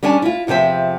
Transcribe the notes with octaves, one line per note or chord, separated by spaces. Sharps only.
G3 C#4 D4 G#5
E4 F4
E2 C3 F3 C5 E5